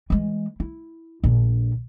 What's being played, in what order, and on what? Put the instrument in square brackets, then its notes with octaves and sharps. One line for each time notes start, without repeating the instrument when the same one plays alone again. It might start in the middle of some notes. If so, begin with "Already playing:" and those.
[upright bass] E3 G#3
E4
A#1 D3